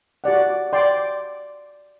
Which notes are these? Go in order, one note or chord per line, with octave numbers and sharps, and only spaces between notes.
F#4 G4 D5 F#5
D5 G5 C6 D6